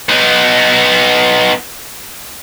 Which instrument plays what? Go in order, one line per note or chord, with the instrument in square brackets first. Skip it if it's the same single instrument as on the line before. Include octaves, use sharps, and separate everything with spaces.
[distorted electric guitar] B3 D#4